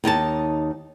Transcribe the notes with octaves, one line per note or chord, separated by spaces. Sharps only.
D#2 D#4 C#5 A5